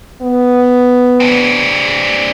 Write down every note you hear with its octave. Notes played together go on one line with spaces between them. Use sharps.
B3
C4 D4